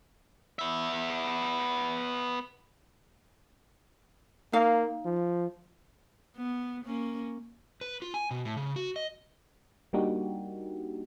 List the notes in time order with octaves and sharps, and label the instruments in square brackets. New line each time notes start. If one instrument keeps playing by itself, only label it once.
[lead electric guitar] B3 E5
[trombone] A#3 [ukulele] D#4 F5
[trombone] F3
[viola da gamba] B3
A#3 C#4
[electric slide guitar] B4
F4
G#5
B2
A2
C#3
F#4
D#5
[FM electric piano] G3 A#3 D4 D#4 F#4 G4